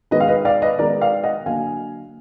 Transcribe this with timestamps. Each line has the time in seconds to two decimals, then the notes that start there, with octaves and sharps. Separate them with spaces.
0.11 D#3 G#3 B3 B4 D#5
0.20 F5
0.28 B4 D#5
0.45 D5 F5
0.62 B4 D#5
0.79 D#3 G#3 B3 A#4 D5
1.01 D5 F5
1.23 D#5 F#5
1.46 D3 F#3 A#3 F5 G#5